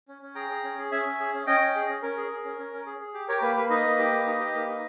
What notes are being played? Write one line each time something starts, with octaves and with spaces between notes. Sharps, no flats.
C#4
C#4
G#4 G5 A#5
G#4
C#4
G#4
C#4 E5 G#5
C#4
G#4
C#4
C#4 D#5 G5
C#4
G#4
C#4
C#4 A#4
G#4
G#4
C#4
C#4
C#4
G#4
G#4
G4
G4 A#4 C#5
A#3 B4
A#3 B4
D#4 B4 D#5
A#3
G4
A#3
D#4
G4
A#3
D#4